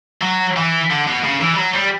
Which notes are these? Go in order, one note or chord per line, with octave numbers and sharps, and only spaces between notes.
F#3
E3
D3
B2
C#3
E3
G3
F#3
G3